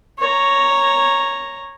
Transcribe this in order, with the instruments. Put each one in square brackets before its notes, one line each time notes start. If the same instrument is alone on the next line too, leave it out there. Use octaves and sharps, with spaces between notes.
[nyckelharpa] C#5 A#5